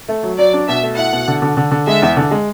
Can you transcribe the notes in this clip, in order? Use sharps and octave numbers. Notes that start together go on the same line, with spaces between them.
A3
F#3
F#3 D5
D4
B2 E5
A3
E4 F#5
B2
D3
D3
D3
D3
G#3 E5
E2
D3
G#3